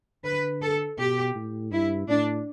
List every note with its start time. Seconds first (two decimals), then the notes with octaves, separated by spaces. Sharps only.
0.24 D3 B4
0.62 A4
0.98 B2 G4
1.35 A2
1.71 G2 E4
2.08 A2 D4